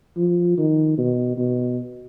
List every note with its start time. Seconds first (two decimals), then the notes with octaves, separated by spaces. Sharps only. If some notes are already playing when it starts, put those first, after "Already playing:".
0.17 F3
0.58 D#3
0.98 B2
1.37 B2